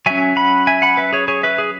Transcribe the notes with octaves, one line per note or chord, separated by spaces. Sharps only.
F#3 C#4 E5 G#5
F#5 B5
E5 G#5
F#5 B5
B4 E5
G#4 C#5
G#4 C#5
B4 E5
G#4